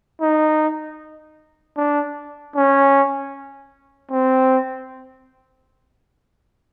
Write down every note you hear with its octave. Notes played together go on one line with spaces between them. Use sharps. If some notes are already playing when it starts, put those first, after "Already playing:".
D#4
D4
C#4
C4